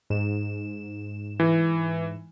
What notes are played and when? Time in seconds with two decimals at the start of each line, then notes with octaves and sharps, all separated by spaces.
0.10 G#2 E7
1.40 E3